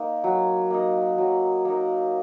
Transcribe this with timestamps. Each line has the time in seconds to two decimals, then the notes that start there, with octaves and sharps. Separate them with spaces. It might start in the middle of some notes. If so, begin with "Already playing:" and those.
Already playing: A#3 D#4
0.24 F#3
0.70 A#3 D#4
1.18 F#3
1.65 A#3 D#4